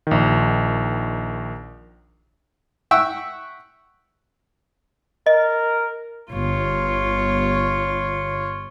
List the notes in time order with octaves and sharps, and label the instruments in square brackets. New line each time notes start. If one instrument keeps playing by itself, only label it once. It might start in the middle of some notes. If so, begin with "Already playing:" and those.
[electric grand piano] A#1 D#3
[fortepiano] E5 F#5 G5 C#6 E6
[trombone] A#4 [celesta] D#5
[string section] G1 [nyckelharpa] F4 C#5